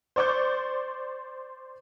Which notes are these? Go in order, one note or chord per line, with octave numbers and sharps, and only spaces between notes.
C5 D5 C#6 D6 G6